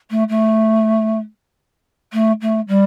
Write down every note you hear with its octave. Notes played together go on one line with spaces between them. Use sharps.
A3
A3
A3
A3
G3